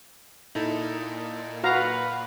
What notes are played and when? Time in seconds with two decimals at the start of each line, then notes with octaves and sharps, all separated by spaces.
0.55 A#2 D#4 E4 A4
1.64 F#4 B4 F5 A#5